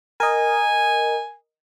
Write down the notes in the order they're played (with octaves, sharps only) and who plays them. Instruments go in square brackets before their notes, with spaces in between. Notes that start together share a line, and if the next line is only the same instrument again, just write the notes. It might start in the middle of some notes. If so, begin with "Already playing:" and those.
[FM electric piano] A#4 D#5 [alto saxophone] G#5